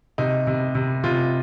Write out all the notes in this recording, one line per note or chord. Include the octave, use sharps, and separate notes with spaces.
C3 D#4
C3
C3
C3 F4